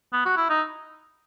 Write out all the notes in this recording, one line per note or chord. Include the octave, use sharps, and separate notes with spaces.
B3
F#4
E4
D#4